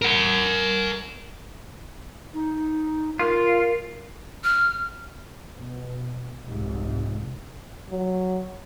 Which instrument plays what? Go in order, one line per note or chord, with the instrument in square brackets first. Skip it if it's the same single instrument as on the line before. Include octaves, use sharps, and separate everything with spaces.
[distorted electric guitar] A#4 F#5
[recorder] D#4
[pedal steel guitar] F4 [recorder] A#4
[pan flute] F6
[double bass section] B2
F1 C2 G#2 C3
[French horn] F#3